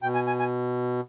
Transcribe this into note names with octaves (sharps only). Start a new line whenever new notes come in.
B2 G5
G#5
G#5
G#5